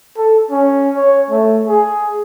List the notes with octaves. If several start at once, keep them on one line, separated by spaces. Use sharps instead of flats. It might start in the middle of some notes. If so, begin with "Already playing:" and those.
A4
C#4
C#5
A3
G#4